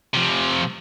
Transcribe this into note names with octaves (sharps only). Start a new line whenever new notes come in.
C3 F3